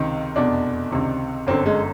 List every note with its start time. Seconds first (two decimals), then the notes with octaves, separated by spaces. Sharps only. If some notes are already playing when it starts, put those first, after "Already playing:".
Already playing: C#2 C3 D#3
0.36 F1 E2 B2 D4
0.91 C#2 C3 D#3
1.47 G1 F#2 D3 C4
1.66 G#3